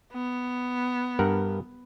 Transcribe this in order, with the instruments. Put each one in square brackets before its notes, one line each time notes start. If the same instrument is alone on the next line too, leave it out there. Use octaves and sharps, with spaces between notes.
[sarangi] B3
[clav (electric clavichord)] G2 A#4 F#5